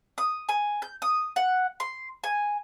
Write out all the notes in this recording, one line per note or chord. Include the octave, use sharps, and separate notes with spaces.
D#6
G#5
G6
D#6
F#5
C6
G#5